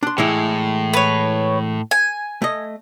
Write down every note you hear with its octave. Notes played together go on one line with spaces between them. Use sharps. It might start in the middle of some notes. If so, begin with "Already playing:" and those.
D4 C6
A2 E3 G#3 E4
B4 C#5
G#5
A3 D#5